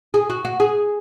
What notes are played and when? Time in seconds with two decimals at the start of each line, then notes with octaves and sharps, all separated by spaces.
0.14 G#4
0.30 F#4
0.45 F#4
0.60 G#4